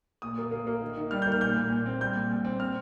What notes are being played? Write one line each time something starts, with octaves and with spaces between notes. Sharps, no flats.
A#2 D#6
A#3
A#3
A#3
D#3
D#3
G3 F6
G6
A#3
F6
A#2 G6
A#2
A#2
C4
G3 G6
A#2
A#2
C4
C4 F6